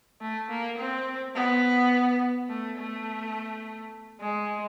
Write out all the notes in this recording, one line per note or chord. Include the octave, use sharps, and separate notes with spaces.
A3
A#3
C4
B3
A3
A3
G#3